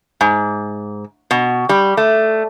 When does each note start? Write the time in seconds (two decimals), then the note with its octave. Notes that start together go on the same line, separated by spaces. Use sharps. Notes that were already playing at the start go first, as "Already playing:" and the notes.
0.21 G#2
1.31 B2
1.69 G3
1.97 A3